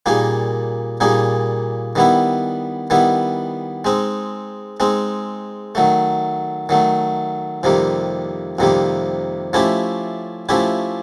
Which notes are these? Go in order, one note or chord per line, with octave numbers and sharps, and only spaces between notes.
A#2 G3 A#3 D#4 G#4
A#2 G3 A#3 D#4 G#4
D#3 G3 B3 E4
D#3 G3 B3 E4
G#3 C4 D#4
G#3 C4 D#4
D#3 F#3 A3
D#3 F#3 A3
F2 C3 D#3 G3 A#3
F2 C3 D#3 G3 A#3
F3 A3 C#4 E4 G4
F3 A3 C#4 E4 G4